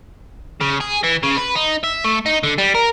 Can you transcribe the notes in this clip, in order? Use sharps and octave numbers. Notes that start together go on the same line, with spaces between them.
C#3
G#4
E3
C#3
B4
D#4
E5
A3
D#4
D3
G3
A#4